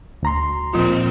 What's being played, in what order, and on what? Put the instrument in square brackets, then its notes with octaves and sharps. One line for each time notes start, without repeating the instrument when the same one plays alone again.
[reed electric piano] D2 A#5 C6
[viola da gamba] A#2 C4 [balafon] F3 F4